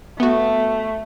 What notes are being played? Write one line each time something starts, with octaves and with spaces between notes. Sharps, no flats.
A3 B3 F#4